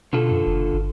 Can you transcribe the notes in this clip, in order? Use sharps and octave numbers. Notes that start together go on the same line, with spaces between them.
B2 D3 F4 A4
F#2
F#1
G1